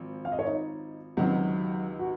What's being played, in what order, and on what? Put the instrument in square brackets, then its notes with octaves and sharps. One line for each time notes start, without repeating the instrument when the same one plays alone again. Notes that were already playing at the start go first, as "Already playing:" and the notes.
Already playing: [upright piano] G#1 F3
[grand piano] F5
D#5
C#5
D#4 D#5
[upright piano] C#2 C3 D#3 [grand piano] F#3 F#4
[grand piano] F#4